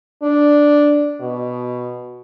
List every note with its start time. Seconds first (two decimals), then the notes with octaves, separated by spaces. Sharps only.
0.23 D4
1.21 B2